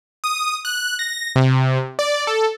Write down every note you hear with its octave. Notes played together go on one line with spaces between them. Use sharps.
D#6
F#6
A#6
C3
D5
A4